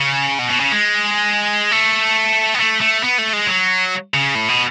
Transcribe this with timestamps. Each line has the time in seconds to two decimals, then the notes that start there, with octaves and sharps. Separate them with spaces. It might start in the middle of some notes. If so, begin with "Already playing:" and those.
Already playing: C#3
0.39 B2
0.50 B2
0.60 C#3
0.71 G#3
1.71 A3
2.54 B3
2.59 A3
2.81 A3
3.03 B3
3.18 A3
3.33 G#3
3.47 F#3
4.14 C#3
4.35 A2
4.49 B2